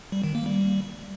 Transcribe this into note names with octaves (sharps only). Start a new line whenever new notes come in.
G3
D#3
A#3
G3